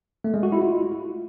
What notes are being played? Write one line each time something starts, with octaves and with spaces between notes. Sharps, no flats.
A3
G#3
F#4
E4
F4